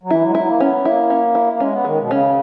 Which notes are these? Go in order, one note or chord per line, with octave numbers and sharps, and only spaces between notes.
F#3
E3 E4
F#3
G#3
F#3 E4
A#3
B3 C#4
A#3 E4
C#4
E4
A#3
G#3 C#4
B3
D#3 G#3
B2
C#3 C#4